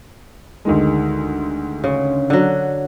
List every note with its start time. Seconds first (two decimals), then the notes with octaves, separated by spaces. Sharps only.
0.65 D2 D#3 G#3
1.84 C#3
2.30 D3 F#3